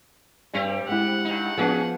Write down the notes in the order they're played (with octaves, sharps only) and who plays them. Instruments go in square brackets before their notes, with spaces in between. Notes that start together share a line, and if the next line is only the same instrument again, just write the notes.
[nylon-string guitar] G2 [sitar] G3 C4 G4
[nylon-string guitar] G#3 E4 [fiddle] F#5
[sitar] G2 D#4
[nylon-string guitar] F3 B3 [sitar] C#4 F#4 G#4